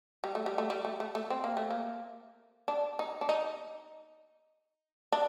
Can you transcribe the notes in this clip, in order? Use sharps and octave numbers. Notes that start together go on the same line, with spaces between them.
G3
A3
G3
A3
G3
A3
A3
A3
C4
A#3
A3
A#3
D4
D#4
D4
D#4
D4